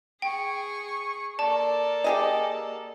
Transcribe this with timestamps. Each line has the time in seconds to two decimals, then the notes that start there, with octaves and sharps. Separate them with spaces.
0.22 G#4 G5 C#6
1.39 A#3 A4 D5 A5
2.04 G4 G#4 D#5